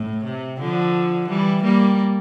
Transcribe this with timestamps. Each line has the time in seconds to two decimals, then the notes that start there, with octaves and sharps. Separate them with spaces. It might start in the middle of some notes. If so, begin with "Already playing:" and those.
Already playing: A2
0.25 C3
0.60 D3 F3
1.28 E3 G3
1.63 G3 A#3